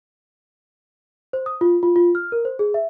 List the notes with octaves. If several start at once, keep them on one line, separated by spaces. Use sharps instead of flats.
C5
D#6
F4
F4
F4
F6
A#4
C5
G#4
E5